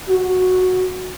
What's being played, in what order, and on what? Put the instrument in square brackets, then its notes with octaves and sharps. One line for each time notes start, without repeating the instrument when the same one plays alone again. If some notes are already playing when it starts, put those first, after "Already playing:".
[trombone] F#4